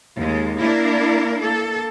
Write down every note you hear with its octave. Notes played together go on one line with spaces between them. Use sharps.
D#2 G#3
A#3 D4 E4 A#4
A#3 A4